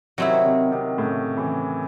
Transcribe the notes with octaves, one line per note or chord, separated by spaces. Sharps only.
C3 D#3 F#3 C4 E4
C3 D#3
C3 D#3
A2 C#3
C#3 E3